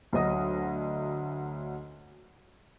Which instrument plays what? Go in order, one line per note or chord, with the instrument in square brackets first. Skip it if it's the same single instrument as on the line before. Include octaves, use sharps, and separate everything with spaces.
[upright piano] D2 D3 F#3 D#5 D#6 A#6